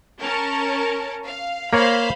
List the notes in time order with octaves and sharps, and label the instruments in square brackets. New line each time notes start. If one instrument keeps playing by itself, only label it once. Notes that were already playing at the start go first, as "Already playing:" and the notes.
[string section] C#4 A#4 A5
F5
[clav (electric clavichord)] A#3 C#5 A#5 [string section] C5 F5 B5